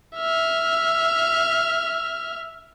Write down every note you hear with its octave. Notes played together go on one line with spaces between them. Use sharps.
E5 F6